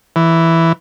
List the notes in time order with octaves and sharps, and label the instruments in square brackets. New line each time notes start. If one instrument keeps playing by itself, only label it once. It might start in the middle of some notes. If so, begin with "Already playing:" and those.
[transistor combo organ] E3